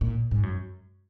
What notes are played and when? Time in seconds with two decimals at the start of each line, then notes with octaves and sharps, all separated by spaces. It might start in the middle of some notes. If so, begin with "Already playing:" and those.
0.01 A#2
0.31 G#2
0.43 F#2